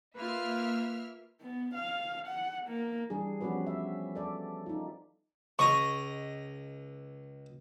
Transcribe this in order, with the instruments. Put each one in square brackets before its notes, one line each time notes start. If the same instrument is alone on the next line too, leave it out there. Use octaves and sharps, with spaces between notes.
[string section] A#3 E5 F6 [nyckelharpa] F4 B4
[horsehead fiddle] B3
F5
F#5
A#3
[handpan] E3 G3 D4 G#4
F3 B3 C#4 F#4 B4 D5
E5
A4 D5
D#4 F4
[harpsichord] C#2 D#5 A#5 [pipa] C#6